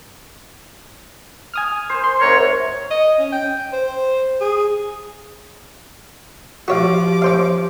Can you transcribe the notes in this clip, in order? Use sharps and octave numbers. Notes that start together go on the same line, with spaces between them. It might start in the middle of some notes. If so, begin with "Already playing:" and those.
G#5 D#6 F6
C5
C6
G#2 C3 A#4 C#5
D#5
C#4
G5
C5
G#4
F3 F#4 G4 C#5 F5 D6
C#4 C5 F5